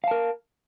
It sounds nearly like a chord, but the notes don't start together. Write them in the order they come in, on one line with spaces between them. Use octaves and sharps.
F5 A5 A#4